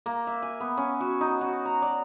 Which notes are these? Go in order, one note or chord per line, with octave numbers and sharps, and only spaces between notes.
A#3
E5
G#5
B3
C#4
F#4
D#4
F#4
A#5
D5